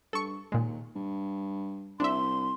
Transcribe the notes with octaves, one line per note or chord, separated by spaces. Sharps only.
G2 A4 C#6
D#2 A#2 G#3
G2
C2 D4 E5 C6